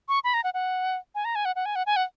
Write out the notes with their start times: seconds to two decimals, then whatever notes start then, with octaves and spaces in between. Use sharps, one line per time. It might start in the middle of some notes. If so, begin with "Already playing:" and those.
0.08 C#6
0.24 B5
0.34 A#5
0.44 F#5
0.54 F#5
1.15 G#5
1.25 A#5
1.35 G#5
1.45 F#5
1.56 F#5
1.66 G#5
1.76 F#5
1.86 G#5
1.96 F#5